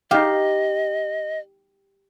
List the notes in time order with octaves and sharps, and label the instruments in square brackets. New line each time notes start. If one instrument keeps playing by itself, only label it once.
[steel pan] D#4 F5 [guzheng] G4 [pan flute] D#5